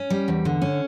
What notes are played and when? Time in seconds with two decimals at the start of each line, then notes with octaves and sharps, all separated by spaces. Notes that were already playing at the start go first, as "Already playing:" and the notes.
Already playing: C#4
0.10 G3
0.28 E2
0.45 D3
0.62 C#4